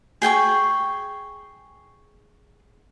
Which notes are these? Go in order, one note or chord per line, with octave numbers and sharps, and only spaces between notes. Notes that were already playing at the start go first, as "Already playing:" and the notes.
G#4 G5 G#5 C#6